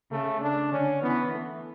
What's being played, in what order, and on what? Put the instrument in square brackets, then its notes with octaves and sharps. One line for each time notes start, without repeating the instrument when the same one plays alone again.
[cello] C#3 [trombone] A3
[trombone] D4
[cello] D3 [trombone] C#4
[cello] E3 [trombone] B3
[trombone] A3